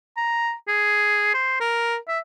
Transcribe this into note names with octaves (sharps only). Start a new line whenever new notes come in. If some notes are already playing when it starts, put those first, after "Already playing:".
A#5
G#4
C5
A#4
E5